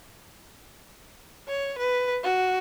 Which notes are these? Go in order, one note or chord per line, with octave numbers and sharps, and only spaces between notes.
C#5
B4
F#4